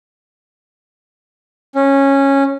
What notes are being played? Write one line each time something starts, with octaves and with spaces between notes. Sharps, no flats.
C#4